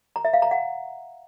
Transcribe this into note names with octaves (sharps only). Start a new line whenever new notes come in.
A#5
E5
F5
A#5
F#5